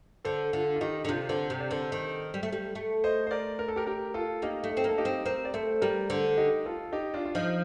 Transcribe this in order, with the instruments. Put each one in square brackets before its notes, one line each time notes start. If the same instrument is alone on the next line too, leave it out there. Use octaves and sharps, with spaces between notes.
[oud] D3 [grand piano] A4 C5
[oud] D3 [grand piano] F4 A4
[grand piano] F4
[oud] D#3 [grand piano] D#4 G4
[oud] D3
[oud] C3 [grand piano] D4 F4
[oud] D3 [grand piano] A4 C5
[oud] C3
[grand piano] D5
[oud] D3 [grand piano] A4 C5
[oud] D#3
G3
A3
G3
A3
[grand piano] C5 D#5
C5
A#4 D5
A#4
A4
G4 A#4
G4 A#4
F4 A4
[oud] A#3 [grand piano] D#4 G4
[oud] A3
[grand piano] D#4
[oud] C4
[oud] A#3 [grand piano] A4
[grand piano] D#4 G4
[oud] C4
[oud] C4 [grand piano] G4 A#4
[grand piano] D5
[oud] A3 [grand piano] A4 C5
[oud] G3 [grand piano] A#4 D5
[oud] D3 [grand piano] A4 C5
[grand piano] D#4 G4
F4 A4
D#4 G4
D4 F4
F4
[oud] F3 [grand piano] D#4